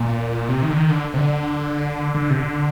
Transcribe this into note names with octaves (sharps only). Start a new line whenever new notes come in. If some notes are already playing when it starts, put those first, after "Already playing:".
Already playing: A#2
C3
D#3
D3
D#3
D3
C3
D3
D3
C3
D3